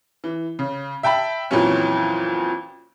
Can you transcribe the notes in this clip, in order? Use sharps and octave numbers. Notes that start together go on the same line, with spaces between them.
E3
C#3
E5 G5 A5 B5
F2 A#2 E3 F#3 C#4